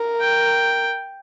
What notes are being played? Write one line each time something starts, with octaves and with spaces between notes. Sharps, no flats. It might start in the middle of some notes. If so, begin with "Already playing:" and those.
Already playing: A#4
G5